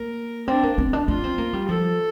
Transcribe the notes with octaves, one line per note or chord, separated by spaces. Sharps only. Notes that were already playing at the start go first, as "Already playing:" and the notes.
Already playing: A#3 A#4
C4 D4
A#3
C4
D4
D4 F4
C4
A#3
G3
F3 A4